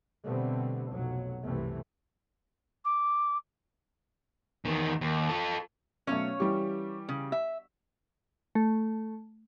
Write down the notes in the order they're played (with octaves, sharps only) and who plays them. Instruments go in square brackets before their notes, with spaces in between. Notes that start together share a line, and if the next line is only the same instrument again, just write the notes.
[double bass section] B2 D3 G3 A3 B3 C4
F1 B1 F#3
C2 F#2 C3 E3 A3
[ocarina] D6
[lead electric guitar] E2 D#3
D#2
F4 A4
[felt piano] B2 F#3 A3 [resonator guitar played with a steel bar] C#4 C#5 F5
[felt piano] E3 G3 G4
[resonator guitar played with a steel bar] C#3
E5
[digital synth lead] A3